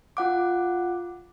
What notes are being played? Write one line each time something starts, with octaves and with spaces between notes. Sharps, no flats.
F4 F#5 D6